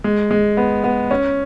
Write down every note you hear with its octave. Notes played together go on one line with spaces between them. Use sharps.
G#3
G#3
B3
B3
C#4